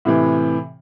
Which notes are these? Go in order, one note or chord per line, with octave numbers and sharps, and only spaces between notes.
A2 C3 E3